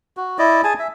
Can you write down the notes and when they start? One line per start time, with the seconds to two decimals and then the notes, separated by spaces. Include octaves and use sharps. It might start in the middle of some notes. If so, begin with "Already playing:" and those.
0.17 F#4
0.38 E4 D5 D#5
0.64 G#4 G#5 A5
0.79 E5